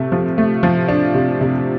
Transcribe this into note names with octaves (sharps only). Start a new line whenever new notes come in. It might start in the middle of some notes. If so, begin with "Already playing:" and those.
Already playing: C3 A3
F3
A3
F3
D4
C3
C3